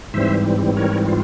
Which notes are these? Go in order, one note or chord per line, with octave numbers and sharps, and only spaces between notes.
G#2 E3 G3 C4 C5 E5
A#4 C#5
F4